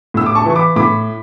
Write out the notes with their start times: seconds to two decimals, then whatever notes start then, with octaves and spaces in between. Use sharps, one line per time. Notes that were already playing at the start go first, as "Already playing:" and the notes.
0.14 A2 E6
0.26 D6
0.35 A5 C#6
0.46 E3 C#6
0.56 B5 D6
0.76 A2 B5 D6